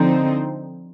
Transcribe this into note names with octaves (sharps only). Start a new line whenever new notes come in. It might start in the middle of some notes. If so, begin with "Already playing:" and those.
Already playing: D3 F3 C4 D#4